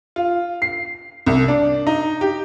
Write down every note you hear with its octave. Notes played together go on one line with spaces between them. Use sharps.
F4
C7
C2
D4
D#4
G4